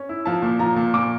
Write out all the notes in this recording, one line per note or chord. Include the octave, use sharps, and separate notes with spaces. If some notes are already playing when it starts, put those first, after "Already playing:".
Already playing: C#4
E4
F3 A5
A#2
F3 A#5
A#2
A#2 D6